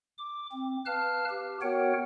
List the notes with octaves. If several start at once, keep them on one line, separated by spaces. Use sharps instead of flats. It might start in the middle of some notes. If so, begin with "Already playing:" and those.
D6
C4
B4 F5 A5 F6 F#6
G4
B3 F#4 A#4 C#5 F#5 G5